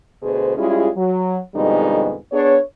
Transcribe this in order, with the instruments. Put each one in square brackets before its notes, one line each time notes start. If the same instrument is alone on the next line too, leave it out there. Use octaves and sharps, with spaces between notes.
[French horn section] D2 B2 G#4 C5
G3 G#3 C#4 E4 F4 G#4
F#3
F2 B2 D3 G3 G#3 D#4
B3 D4 G#4 C#5